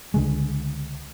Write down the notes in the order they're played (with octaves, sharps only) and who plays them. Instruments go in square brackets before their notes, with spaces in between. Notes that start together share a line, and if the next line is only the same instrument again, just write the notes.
[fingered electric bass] C#2 D3 G#3